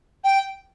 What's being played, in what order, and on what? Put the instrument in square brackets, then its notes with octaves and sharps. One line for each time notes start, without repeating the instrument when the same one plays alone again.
[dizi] G5